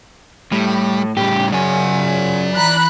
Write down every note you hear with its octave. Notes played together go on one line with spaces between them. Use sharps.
A2 G3
A2 C#3 G3 G4
F#2 D5 G#5
E3 A#5 B5 F#6